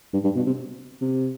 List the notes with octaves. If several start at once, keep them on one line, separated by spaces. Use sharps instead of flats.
G2
G2
B2
C3
C3